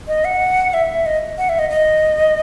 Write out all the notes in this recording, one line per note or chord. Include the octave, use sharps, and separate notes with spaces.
D#5
F#5
E5
D#5
F#5
E5
D#5
D#5